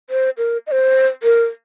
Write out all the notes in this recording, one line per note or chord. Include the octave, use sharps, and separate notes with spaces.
C5
A#4
D#5
C5
A#4